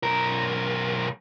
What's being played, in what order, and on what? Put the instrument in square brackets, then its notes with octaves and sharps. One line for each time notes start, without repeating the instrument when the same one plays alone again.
[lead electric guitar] B1 A#4